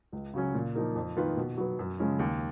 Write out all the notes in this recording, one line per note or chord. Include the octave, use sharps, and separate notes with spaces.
C#2
C#3 F#3 C#4
A#2
F3 A#3 D#4 A#4
F2
D#3 A#3 F4 B4
B2
F#3 B3
F#2
C#3 F3 G#3 C#4
D#2